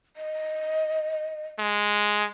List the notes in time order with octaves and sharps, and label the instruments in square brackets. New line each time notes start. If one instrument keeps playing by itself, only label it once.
[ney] D#5
[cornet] G#3